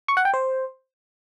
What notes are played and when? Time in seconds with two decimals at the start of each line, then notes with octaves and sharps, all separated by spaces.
0.08 C#6
0.17 F#5
0.25 G5
0.34 C5